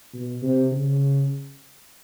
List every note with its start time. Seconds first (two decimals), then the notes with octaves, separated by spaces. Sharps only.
0.13 B2
0.42 C3
0.72 C#3